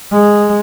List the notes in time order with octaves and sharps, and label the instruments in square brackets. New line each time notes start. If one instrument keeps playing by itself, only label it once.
[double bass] G#3